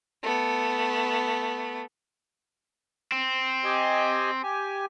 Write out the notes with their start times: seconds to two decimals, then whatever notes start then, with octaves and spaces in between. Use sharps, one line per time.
0.23 A3 B3
3.12 C4
3.64 G4 D#5 G#5
4.43 G4 G#5